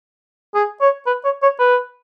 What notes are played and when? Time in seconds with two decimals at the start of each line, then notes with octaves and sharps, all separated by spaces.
0.55 G#4
0.81 C#5
1.07 B4
1.25 C#5
1.43 C#5
1.60 B4